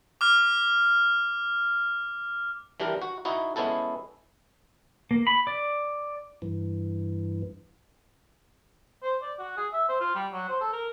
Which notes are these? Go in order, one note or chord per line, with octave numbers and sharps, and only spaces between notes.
D6 F6
E3 G3 D4 G4 A#4
F#4
D#4 E4 F#4
G#3 B3 C#4 E4 A4
A#3
B5
D5
G2 E3
C5
D5
F#4
G#4
E5
C5
F4
G3
F#3
C5
A4
A#4